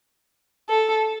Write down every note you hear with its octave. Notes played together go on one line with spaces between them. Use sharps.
A4